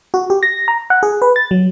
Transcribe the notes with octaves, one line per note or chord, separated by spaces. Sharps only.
F#4
G4
A#6
A#5
F#5
G#4
B4
A6
F#3